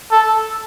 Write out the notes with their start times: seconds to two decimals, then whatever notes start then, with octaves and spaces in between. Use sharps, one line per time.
0.11 A4